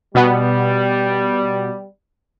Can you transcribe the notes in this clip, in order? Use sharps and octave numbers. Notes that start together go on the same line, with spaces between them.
B2 G3 B3